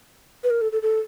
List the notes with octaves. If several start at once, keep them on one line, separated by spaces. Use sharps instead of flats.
B4
A#4
A4
A4
A4